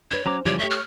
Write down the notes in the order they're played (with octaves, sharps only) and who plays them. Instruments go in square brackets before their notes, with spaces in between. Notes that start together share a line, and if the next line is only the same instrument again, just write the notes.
[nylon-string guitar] D4 B4 [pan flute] C#5
[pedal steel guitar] F#3 A#5 D6 [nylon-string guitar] C#4 C5
[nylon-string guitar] C#3 G3 G4 [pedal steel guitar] E3 F3 D5 [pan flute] C#5
[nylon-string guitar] A3 G4 [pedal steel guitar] C#5 [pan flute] E5
[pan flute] F6